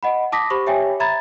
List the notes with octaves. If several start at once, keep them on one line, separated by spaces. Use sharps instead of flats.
D#5 F#5 B5
A5 D6 D#6 A#6 B6
G4 C5 B5 C#6
G4 C#5 E5 G5 G#5
E5 A#5 B5 G#6 A6